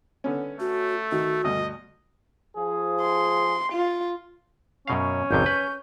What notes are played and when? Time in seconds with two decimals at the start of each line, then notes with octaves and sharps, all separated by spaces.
0.24 D3 B3 C#4
0.60 A3 F#4
1.12 D#3 F#4
1.44 D2 G2 B2 D#5
2.56 F3 G#4
3.01 C6
3.73 F4
4.87 F#2 B2 C#4 F5
5.31 G#1 F2 C3 G6
5.46 B4